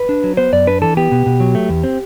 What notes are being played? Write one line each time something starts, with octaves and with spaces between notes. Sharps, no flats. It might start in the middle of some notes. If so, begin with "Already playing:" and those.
Already playing: B4
D4
F#3
B3 C5
F#2 D5
D4 B4
E3 A4
B3 G4
B2
B2
F#3
A3
E2
C4